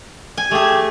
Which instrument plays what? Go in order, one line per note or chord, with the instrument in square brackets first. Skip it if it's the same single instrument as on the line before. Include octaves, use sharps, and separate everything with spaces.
[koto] G#5
[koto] A3 G#4 [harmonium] G4